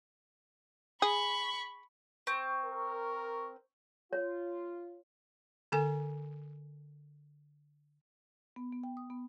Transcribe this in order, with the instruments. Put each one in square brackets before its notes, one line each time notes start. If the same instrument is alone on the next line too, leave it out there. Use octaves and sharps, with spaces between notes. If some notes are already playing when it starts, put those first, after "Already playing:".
[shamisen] G#4 [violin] B5 C#6
[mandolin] C4 [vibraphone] C#6
[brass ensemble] A#4
[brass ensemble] F4 [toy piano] C#5
[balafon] D3 A4 G#5
[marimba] B3
B3
G5
D#6
B3